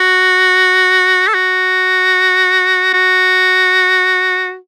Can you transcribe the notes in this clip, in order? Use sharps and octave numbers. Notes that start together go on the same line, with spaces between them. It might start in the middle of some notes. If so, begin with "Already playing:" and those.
Already playing: F#4
A4
F#4
F#4